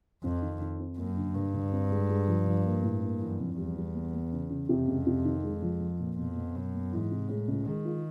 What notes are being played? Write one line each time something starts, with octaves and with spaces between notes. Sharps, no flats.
F2 C4
D#3
D#3
C4
F#2 A#3
D3
G2 D3
D2
C4
G#3
G#3
F3
F3
A#3
A2
A#3
F#2 E3
F2
E2 G3
G3
B3
B3
C#3
C#3
F2 C3
C#2
C3
D#3
G#3
F3
F3
A#2
F2 B2
B3
F#2 B2
B3
G#2 E3
C3
A2 G#3
C#2
D#3 G#3
F4